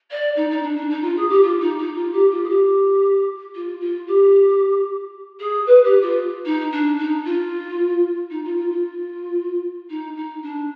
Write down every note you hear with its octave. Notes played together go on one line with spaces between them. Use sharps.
D5
D#4
D#4
D4
D4
D#4
F4
G#4
G4
F4
D#4
D#4
F4
G4
F4
G#4
G4
F4
F4
G4
G#4
B4
G4
F4
D#4
D4
D#4
F4
D#4
F4
F4
F4
D#4
D#4
D4